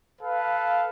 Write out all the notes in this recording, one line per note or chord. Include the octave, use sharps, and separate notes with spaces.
A4 B4 F5